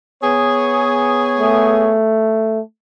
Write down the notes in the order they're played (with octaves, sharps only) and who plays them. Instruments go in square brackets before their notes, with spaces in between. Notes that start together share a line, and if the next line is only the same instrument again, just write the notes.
[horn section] B3 G#4 C#5
[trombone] A3